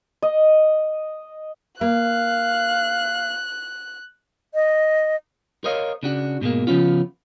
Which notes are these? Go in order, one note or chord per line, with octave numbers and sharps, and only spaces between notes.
D#5
A#3 F5 F#6
D#5
A#4 C5 C#5 D#5 F5
C#3 D4 F#4
G#2 B2 G#3 A#3
C#3 F3 A#3 B3 C#4 F4